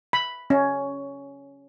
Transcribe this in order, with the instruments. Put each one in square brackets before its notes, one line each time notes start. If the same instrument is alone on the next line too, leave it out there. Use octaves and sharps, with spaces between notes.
[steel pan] B5
C#4